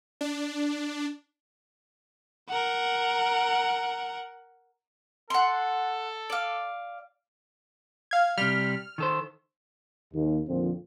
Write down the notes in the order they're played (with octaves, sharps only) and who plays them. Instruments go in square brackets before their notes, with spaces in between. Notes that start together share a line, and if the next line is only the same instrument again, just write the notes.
[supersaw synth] D4
[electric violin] A#4 F#5
[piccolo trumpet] A4 [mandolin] F#5 C6
[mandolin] D5 F5
[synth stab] F5 G#6
[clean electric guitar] C3 G3 [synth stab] F6
[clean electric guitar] D#3 A4 C5
[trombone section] D#2
F2 A#2 D3 D#3 F3 C4